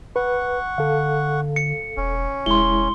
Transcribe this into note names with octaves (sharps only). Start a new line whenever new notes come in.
B4 F#5 C#6
D3 A4 F5
C#7
E1 C#4
E1 G#3 E4 C6 G7